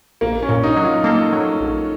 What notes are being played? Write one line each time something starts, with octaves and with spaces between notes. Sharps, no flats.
A#1 A#3
C#4
A#2
D#4
F#3
F4
A#3 A4
F#3
A#1